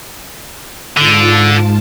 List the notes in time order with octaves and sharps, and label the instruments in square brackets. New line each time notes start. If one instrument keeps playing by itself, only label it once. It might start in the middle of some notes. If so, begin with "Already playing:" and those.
[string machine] G#2 F4 A5 [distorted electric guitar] D3